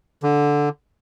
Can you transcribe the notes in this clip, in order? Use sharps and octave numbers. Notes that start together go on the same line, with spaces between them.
D3